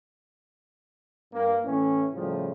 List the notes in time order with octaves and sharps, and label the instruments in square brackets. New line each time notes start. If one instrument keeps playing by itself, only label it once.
[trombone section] G2 A#3
A2 E3 C#4
A2 C#3 F3 G3